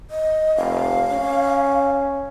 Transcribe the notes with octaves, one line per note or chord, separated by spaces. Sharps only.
D#5
F1 F5
C#4